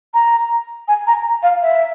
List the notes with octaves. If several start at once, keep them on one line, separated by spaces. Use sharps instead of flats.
A#5
G#5
A#5
F5
E5